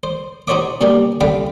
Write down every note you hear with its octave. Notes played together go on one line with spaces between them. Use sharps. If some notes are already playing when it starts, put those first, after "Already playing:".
C5
D#4 F#4 C5 C#5 E5 D6
B2 G3 A#3 D4 G4
C2 D3 F5 G5 B5